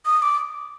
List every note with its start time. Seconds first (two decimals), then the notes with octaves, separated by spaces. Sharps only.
0.06 D#6
0.22 D6